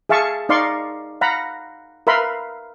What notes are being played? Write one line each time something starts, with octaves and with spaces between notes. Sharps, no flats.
G#4 E5 F5 A5 C#6
D#4 D5 F5 C6 C#6
F5 F#5 A#5 B5
A#4 B4 E5 F5 B5 C6